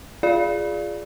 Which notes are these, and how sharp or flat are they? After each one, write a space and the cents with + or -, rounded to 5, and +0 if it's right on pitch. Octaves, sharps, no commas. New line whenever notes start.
F4 -5 G#4 +0 D5 +0